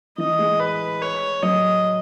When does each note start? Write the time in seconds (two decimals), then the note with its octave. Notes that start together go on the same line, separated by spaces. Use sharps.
0.18 E3 D#5
0.39 G#3
0.60 B4
1.01 C#5
1.43 F#3 D#5